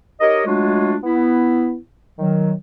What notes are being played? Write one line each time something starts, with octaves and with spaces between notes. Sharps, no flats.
D#4 G4 A#4 C#5 D#5
F#3 G#3 A3 D4 F4 F#4
B3 E4
D#3 F#3